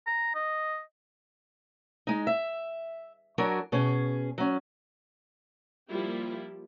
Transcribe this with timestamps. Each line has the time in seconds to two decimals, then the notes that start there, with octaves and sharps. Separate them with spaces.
0.07 A#5
0.35 D#5
2.07 G#3 D#4
2.27 E5
3.38 F#3 D4 F#4 A#4 G#5
3.72 B2 C#4 G#4
4.38 F#3 C#4
5.88 F3 G3 A#3 E4 F4 G4